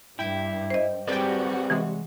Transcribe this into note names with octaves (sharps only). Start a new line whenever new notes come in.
G2 E4 G5
C5 D#5
G3 C4 F#4 G#4 B4 D5 G5
C3 E3 G#3